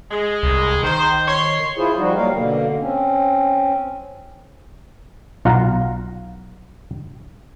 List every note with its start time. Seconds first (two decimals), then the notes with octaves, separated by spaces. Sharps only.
0.11 G#3
0.43 C2
0.83 D#3 C5
1.27 C#5 C6
1.77 E4 F4 G#4 C5
1.96 F3 G3 D#4 F#4
2.15 F#3 G3 A#3 A#4 F5
2.33 B2 D3 A#3
2.80 C4 C#4
5.45 B1 F4 F5 F#5 A#5